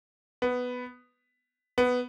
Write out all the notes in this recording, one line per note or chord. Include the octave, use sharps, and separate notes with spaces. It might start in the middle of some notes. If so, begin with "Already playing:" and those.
B3
B3